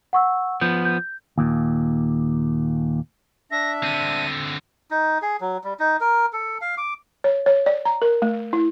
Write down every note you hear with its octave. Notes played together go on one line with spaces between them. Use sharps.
F#5 C#6 E6
F3 B3 G6
G6
D#2 A#2
D4 E5 A#6
D3 C4 D#7
D#4
G#4
F#3
G3
D#4
A#4
A4
F5
D6
C#5
C#5
D5
A#5
A#4
A3
E4